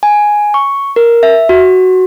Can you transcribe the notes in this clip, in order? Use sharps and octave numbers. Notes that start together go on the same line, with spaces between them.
G#5
C#6
A#4
E5
F#4